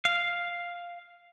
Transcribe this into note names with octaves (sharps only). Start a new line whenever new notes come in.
F5